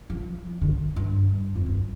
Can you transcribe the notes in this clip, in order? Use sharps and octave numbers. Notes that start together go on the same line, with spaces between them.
F3
D3
G2
F2
G2